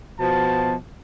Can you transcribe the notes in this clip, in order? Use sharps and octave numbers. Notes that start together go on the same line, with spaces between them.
B2 F3 A5